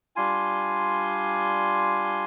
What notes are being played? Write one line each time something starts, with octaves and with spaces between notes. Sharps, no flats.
G3 D4 F4 G#5 C6